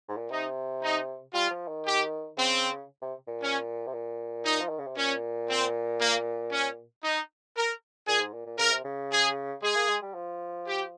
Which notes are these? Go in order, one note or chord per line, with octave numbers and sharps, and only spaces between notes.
G#2
A#2
C3 D#4
D#4
G3 F4
F3
D#3
G4
C#3 C4
C3
A#2
C#4
C3
A#2
D#4
F3
D#3
C#3
C3
A#2 C#4
C4
A#3
C#4
D#4
A#4
A#2 G#4
G#2
A#2
A#2
C#3 A#4
C3
C#3
G#4
G#3 G#4
A#3
G#3
G3
F3
G4